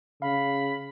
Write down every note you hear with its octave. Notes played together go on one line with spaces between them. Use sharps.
C#3 F5 B5